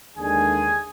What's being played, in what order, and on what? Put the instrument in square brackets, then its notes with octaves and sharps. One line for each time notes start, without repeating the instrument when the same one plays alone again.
[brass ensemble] D#2 D3 G#3 D4 G#4 G#5